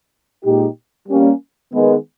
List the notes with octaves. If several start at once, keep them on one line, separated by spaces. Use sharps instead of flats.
A#2 G#3 D#4 G4
G3 A#3 C#4
D#3 G#3 B3